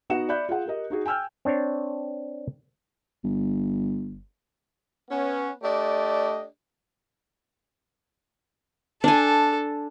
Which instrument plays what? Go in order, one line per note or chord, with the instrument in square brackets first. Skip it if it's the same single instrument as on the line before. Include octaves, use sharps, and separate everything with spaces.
[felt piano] B3 D#4 F#4 F#5 C#7 E7
D5 E5 B5 F#6 G6
F4 G#4 F#5
G4 A#4 D#5
D#4 F#4 G#4
G5 G#5 E6 F6 G6
[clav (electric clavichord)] C4 D4 C#5
[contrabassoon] G1
[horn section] B3 C#4
A3 D4 G4 D5 D#5
[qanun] D4 G#5 [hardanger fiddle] A4